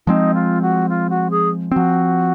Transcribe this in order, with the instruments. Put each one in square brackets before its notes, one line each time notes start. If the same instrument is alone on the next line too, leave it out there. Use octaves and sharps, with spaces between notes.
[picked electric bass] F3 G#3 C4 [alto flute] D#4
[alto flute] F4
F#4
F4
F#4
G#4
[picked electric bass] F3 C4 [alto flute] F#4